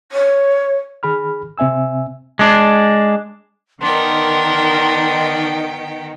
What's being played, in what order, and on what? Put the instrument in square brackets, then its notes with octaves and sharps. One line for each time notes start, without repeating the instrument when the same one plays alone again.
[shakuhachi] C#5
[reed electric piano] D#3 G#4 B5 F6
C3 C4 E5 G#5 E6
[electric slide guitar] G#3 D4
[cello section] D#3 [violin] B3 G5 [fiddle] D4 A#4 [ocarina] C6